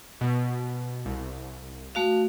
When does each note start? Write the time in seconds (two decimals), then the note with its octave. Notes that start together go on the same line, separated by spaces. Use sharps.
0.21 B2
1.05 C2
1.95 A3 F#4 F5